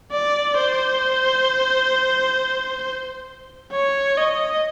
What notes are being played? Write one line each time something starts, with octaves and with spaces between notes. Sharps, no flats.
D5
C5
C#5
D#5